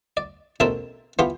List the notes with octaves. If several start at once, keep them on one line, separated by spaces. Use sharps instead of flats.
D5
A1 B2 C4 A#4 E5 A5
E3 B3 F4 G4